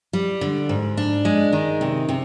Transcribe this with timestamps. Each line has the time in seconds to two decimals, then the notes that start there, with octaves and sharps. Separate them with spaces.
0.13 G3
0.41 D3
0.69 G#2
0.97 D4
1.25 G#3
1.53 D#3
1.81 C3
2.09 C3